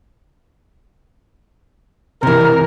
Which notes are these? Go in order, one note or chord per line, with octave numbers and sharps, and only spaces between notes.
C3 E3 A#4